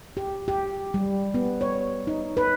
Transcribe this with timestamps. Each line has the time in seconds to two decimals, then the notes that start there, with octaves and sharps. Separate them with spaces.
0.17 G4
0.48 G4
0.94 G3
1.34 B3
1.61 C#5
2.07 D#4
2.37 B4